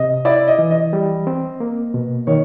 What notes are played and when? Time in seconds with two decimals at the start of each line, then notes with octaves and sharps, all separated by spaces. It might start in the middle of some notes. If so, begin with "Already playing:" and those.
Already playing: C3 D#5
0.25 E4 D5
0.48 D#5
0.59 E3
0.71 D#5
0.93 G3
1.27 C4
1.60 A#3
1.94 B2
2.27 D#3 C#5